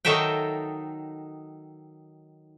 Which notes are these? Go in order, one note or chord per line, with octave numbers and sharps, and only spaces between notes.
D#3 F#3 D#4 A4 E5 G5